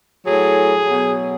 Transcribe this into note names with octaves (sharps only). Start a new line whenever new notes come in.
A2 F#3 G#4
B2 F#3